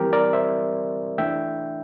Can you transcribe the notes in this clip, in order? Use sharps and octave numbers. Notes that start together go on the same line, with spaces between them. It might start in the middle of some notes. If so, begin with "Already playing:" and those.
Already playing: E3 G3 C4 G4 A#4
A#4 D5
C5 E5
E3 A3 D4 E5 G5